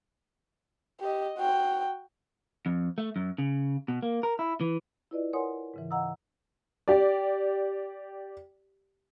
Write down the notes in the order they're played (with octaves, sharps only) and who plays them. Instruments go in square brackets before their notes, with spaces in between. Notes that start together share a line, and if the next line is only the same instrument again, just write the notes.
[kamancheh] G4 D#5
F#4 G5
[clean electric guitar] F2
A3
F#2
C#3
B2
A#3
A#4
E4
E3
[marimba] E4 F4 B4 D5 D#5
A#4 C#5 F#5 G#5 C6 D#6
G#2 C#3 E3
D#5 F5 F#5 A#5 D#6 E6
[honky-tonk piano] G4 D5